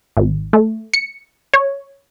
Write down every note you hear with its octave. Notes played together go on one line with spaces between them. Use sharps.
G#1
A3
C#7
C#5